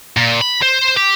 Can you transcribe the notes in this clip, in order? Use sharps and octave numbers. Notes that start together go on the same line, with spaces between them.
A#2
B5
C5
G4